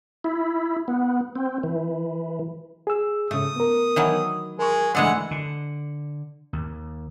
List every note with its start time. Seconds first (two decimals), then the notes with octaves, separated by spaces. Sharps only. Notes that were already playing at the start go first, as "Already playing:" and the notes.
0.24 E4
0.88 B3
1.36 C4
1.63 E3
2.87 G#4 E6
3.31 G#2 C#3 A3 D#6
3.56 B3 A#4
3.96 D#3 E3 F#3
4.59 G#3 A#4 C#6
4.95 C#3 E3 G#3 A3 D4 E5 F#5
5.31 D3
6.53 D#2